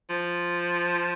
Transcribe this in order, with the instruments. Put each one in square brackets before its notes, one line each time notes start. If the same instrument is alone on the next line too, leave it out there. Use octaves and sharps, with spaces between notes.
[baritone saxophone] F3